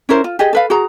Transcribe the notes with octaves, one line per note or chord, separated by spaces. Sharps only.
C#4 E4 A#4 C5
F4
G4 G#4 D#5
A4 B4 F5
F#4 G#4 A#5